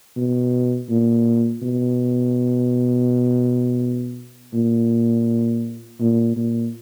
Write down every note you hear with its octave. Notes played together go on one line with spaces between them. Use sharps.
B2
A#2
B2
A#2
A#2
A#2